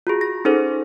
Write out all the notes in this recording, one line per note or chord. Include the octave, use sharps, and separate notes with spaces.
F4 F#4 G#4
A#6
C#4 D#4 G#4 A4 C5